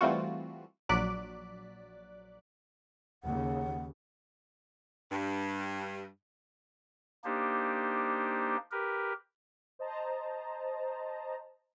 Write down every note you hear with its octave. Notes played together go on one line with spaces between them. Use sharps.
E3 G3 A3 C4 F4 F#4
A#1 F#3 D5 D6 F#6 B6
D#2 C#3 F#5
G2
A#3 D4 D#4 G4 C5
G4 A#4 B4
C5 D#5 A5 A#5